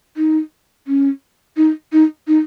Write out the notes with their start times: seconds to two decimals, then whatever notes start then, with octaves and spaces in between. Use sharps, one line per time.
0.17 D#4
0.87 C#4
1.57 D#4
1.93 D#4
2.28 D#4